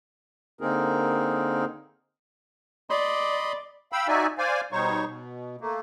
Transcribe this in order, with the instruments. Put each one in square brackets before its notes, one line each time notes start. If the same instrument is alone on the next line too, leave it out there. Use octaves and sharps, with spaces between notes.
[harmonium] D3 A#3 C4 D#4 G#4 A#4
[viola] D5 [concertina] D#5 B5 C6
[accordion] F5 G5 B5 E6
D#4 F#4 D5 E5 G#5
C5 D5 F5 G#5
B2 G3 D#4 C5 C#5 C#6
B2
A3 A#3